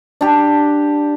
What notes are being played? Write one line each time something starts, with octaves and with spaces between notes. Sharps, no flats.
D4 G4